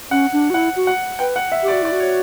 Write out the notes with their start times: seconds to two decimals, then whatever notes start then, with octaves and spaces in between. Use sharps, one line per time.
0.11 C#4 F#5
0.33 D4
0.50 F#4
0.54 E4 F#5
0.76 F#4
0.87 F#5
1.19 B4 G5
1.36 F#5
1.52 E5
1.63 G4
1.68 D5
1.72 F#4
1.82 E4 D5
1.92 F#4
2.00 C#5